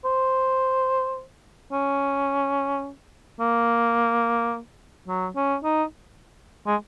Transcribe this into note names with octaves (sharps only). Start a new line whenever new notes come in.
C5
C#4
A#3
F#3
C#4
D#4
G#3